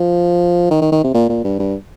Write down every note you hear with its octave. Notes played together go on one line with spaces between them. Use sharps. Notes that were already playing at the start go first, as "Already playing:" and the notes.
Already playing: F3
D#3
D#3
D#3
C3
A#2
A#2
G2
G2